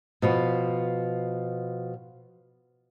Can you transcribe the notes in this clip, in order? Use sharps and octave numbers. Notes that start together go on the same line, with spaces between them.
B2 F3 B3